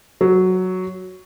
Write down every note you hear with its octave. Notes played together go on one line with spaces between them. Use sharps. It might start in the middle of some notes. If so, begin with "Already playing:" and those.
F#3